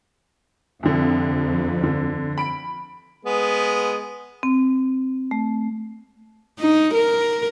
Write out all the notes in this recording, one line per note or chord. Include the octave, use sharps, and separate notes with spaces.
C2 F2 D3
D3
B5 D7
G#3 B3
C4
A3
D#4
A#4